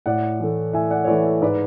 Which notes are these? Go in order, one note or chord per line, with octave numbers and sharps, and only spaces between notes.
A2 D5 F#5
E3 A3
A2 E5 G#5
D5 F#5
C#5
E3 A3 B4 D5
A4 C#5
G#2 B4 D5